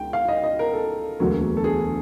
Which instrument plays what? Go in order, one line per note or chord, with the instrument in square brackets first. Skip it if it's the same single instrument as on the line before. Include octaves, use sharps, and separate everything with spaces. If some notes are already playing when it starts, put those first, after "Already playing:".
Already playing: [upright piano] C#2 G5
F5
D#5
D#5
A#4
A4
E1 D2 D3 F#3 A#3
A4
G#4